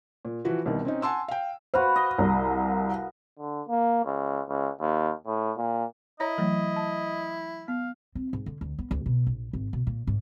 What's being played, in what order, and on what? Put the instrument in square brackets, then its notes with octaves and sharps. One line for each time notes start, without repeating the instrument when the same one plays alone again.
[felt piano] A#2
E3 F3 F#4 B4
C2 B2 D#3
C4 C#4 D#4
F#5 G#5 A5 C6 E6
F5 G5
[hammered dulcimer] F#4 B4 F5 [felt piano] C5
[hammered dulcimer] D#5
[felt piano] C2
[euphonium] D3
A#3
C#2
C#2
D#2
A2
A#2
[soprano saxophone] E4 [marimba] C#5 A#5 A#6 [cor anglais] D#5
[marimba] E3 F#3 A3
A5
[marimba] B3 [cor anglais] F5
[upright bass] C4
G#2
D3
D2
B3
D2
B2
A#1
G#1
B2
A#2
G#2